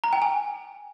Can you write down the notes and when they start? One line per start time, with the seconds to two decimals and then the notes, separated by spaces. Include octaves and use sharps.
0.04 A#5
0.13 G5
0.22 G#5